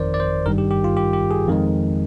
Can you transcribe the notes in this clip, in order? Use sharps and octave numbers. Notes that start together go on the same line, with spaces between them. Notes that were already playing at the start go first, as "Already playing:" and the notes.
Already playing: G1 F2 D#3 A#4 C5 D5
D5
C5
G#1 G2 D#3 G3 A#4
G4
G4
F4
G4
G4
G#4
F2 D#3 G#3